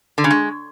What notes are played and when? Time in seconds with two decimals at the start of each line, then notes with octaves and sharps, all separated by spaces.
0.18 D3
0.24 C#3
0.31 G#3